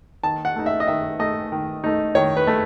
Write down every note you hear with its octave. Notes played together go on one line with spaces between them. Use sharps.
D#3 A5
F#5
A3 D#4
E5
D#5
D#3 E5
A3 D#4 D#5
D#3
A3 D#4
D#3 C#5
B4
A3